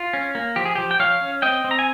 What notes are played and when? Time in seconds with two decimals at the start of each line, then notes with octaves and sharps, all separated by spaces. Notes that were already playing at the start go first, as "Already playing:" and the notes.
Already playing: F4
0.13 C#4
0.35 A#3
0.56 F3 G4
0.66 G#4
0.75 F3 G4
0.91 G5
0.99 F3 C#5 F5
1.21 C#4
1.42 C4 D#5 G5
1.64 C4
1.71 A#5
1.79 G#5